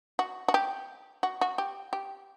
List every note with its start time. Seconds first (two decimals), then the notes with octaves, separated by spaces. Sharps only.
0.19 F#4
0.48 F#4
0.54 G4
1.23 F#4
1.41 F#4
1.58 G4
1.93 G4